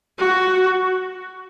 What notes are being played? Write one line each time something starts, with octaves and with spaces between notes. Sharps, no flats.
F#4